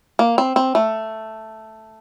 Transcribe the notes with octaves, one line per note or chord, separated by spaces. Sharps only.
A#3
C4
C4
A3